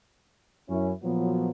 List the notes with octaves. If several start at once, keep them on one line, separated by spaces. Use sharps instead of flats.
F#2 C#4 E4
A#2 F3 F#3 B3